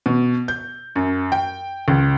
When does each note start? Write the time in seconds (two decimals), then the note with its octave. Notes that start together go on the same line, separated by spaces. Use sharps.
0.06 B2
0.48 G6
0.96 F#2
1.32 G5
1.88 C#2